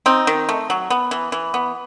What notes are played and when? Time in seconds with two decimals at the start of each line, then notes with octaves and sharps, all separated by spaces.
0.06 C4 D#4
0.27 D#3
0.49 A3
0.70 F#3
0.90 B3
1.11 E3
1.32 E3
1.54 B3